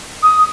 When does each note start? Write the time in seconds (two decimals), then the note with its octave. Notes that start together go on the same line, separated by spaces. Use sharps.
0.23 D#6